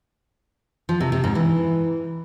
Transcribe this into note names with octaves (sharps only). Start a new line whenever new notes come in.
F3
C3
C3
G#2
E3